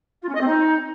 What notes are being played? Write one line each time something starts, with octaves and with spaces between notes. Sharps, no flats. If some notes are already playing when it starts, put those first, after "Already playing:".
F4
C#4
D#5
C4
D#4